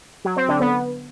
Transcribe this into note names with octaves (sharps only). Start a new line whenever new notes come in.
F#3
C4
D3
B3